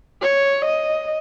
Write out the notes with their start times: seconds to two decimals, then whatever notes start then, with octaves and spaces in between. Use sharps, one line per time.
0.22 C#5
0.65 D#5